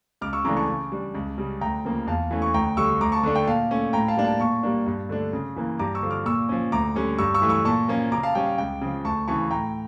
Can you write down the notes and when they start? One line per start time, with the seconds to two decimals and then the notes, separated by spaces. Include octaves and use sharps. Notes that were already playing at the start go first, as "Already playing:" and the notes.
0.21 C#2 D6 F6
0.33 C#6 E6
0.45 C#3 E3 A3 D4 A#5 D6
0.57 A5 C#6
0.68 C#3
0.92 G3 D4
1.15 C#2
1.38 C#3 G3
1.61 D2 G5 A#5
1.85 C#3 F3 A#3
2.07 E2 F5 A5
2.31 E3 A3 C#4
2.42 C#6
2.54 D2 G5 A#5
2.77 D3 G3 C#6 E6
3.01 D2 A#5 D6
3.12 A5 C#6
3.23 D3 A3 D4
3.35 G5
3.47 A#2 F5 A5
3.71 A3 C#4
3.93 A2 G5 A#5
4.08 F5 A5
4.17 G3 A#3 D4
4.24 F5 A5
4.40 A#2 A5 C#6
4.63 G3 A#3 D4
4.86 G2
5.09 D3 A3 D4
5.33 C#3
5.56 E3 A#3
5.79 G2 A#5 D6
5.95 C#6 E6
6.02 D3 F3
6.11 D6 F6
6.26 A#2 C#6 E6
6.49 F3 C#4
6.72 D2 A#5 D6
6.95 D3 G3 C#4
7.18 G2 C#6 E6
7.34 C#6 E6
7.42 E3 A3
7.49 C#6 E6
7.65 A#2 A5 C#6
7.88 F3 A#3 C#4
8.12 C#3 A#5 D6
8.23 F5 A5
8.35 G3 C#4 G5
8.46 F5
8.58 C#2 G5
8.81 C#3 F3
9.05 D2 A5 C#6
9.28 C#3 E3 A5 C#6
9.51 A2 G5 A#5